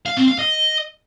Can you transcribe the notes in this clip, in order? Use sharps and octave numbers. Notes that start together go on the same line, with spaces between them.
F5
C4
F5
D#5